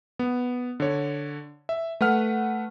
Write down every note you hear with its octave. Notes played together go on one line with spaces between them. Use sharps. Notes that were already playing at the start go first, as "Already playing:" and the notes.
B3
D3 C#5
E5
A3 B4 F#5 F6